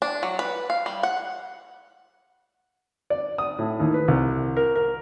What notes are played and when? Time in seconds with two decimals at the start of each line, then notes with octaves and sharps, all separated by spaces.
0.02 D4
0.23 F#3
0.39 B4
0.70 F5
0.86 G3
1.03 F#5
3.10 D5
3.38 D#6
3.59 A2
3.80 D#2
3.94 B4
4.08 C2
4.57 A#4
4.76 A#4